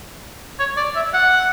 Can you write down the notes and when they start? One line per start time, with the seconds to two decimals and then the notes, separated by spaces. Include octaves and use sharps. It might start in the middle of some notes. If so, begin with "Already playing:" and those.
0.59 C#5
0.77 D5
0.96 E5
1.13 F#5